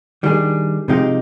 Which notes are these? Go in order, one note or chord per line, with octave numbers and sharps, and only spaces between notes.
D#3 G3 D4 G#4
C3 F3 G#3 D#4 G4